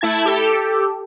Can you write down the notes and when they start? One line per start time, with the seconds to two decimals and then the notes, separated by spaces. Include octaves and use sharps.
0.01 A3 E4 A5 G#6
0.25 G4 A4